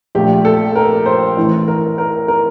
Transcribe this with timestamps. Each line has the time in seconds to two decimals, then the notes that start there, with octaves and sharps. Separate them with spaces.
0.15 A#1 A#2 A3 G4
0.45 A4
0.75 A#4
1.06 C5
1.37 A1 A2 E3
1.68 A#4
1.98 A#4
2.28 A#4